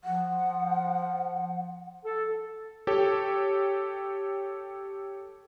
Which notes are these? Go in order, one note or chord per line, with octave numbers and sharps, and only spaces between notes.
F3 F#5
A4
G4 A4 C#5